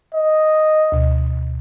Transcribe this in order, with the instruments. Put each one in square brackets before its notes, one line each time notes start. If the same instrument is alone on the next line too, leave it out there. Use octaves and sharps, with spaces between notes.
[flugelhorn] D#5
[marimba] D2 B2